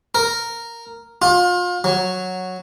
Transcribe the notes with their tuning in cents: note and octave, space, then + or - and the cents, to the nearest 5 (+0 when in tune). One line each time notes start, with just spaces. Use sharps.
A#4 -5
F4 +30
F#3 -5